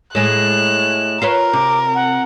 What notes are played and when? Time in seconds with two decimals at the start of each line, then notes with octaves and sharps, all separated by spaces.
0.15 A2 G#3 F#6 E7
1.22 F4 A#4 B4 C#5
1.53 C3 D6
1.95 F#5